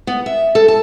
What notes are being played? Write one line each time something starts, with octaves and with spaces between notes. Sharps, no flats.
B3
E5
A4
A5